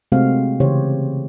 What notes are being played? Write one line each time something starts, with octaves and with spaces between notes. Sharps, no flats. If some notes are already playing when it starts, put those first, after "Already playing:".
C3 G#3 A3 C4 F#4 F5
C#3 E3 G4 C5 C#5